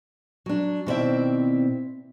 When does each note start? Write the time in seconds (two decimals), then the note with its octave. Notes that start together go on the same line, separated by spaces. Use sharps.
0.46 F#3 D4
0.86 B2 D#3 C4 E4 D5 E5